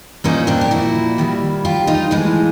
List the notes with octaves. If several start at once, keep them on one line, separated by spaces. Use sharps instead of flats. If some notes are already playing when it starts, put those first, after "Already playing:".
A#2 F3 A#3 C#4 D#4
C4 D4
G4
E4 F#4
D#3 G3 A#3
F4 G4
D#4 F4
A2 E3 G#3